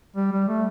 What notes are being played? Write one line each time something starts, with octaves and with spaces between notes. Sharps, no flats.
G3
G3
A3